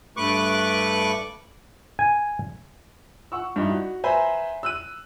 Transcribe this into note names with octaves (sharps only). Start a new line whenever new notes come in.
G2 A3 B4 C#6 D6 F#6
G#5
F#5 C#6 E6
G2 D#4 E4
F#4
B4 C5 E5 G#5 A#5 B5
E6 F#6 D#7